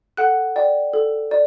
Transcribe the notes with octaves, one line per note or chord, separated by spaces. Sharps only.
A4 F#5 F#6
D5 G5
A4
D5